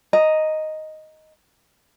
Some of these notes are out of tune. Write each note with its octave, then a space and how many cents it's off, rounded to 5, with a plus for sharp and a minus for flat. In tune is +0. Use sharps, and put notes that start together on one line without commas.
D#5 +0 A#5 +0